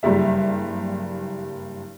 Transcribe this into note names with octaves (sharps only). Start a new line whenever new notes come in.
F#1 G2 G3 E5